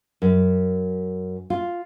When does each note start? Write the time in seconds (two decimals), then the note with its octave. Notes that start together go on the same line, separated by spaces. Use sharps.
0.22 F#2
1.50 F4